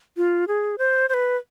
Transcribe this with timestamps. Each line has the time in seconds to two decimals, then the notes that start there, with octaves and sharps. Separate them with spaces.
0.17 F4
0.48 G#4
0.78 C5
1.09 C5
1.14 B4